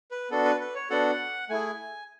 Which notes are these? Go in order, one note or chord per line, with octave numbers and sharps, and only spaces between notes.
B4
B3 D4 F#4 A4
B4
B4
C#5
B3 D4 F#4 A4 F#5
A3 E4 G#4 G#5